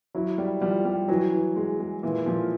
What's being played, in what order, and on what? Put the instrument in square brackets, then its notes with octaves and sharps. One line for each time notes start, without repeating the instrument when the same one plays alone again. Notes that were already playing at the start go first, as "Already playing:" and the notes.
[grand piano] F#3 [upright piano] E4
[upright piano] G3
[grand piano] F3 [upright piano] G3
[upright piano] G3
[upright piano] E3 [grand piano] F#3
[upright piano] E3
G#3
G#3
[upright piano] A#2 [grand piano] E3
[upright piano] A#2 [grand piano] F3